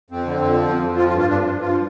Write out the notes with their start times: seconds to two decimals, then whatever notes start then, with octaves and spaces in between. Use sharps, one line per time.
0.10 F2 C4
0.26 D3
0.40 F2
0.54 F3
0.68 F2
0.83 F2
0.97 F3 F4
1.08 F4
1.11 G2
1.18 F4
1.25 G2 D4
1.41 G2
1.55 G2
1.61 F4
1.69 F3